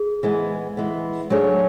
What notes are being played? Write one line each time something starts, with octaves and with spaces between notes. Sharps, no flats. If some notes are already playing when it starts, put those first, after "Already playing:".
Already playing: G#4
E3 G#3 B3
E3 G#3 B3
F#3 A3 D4 G#4 C#5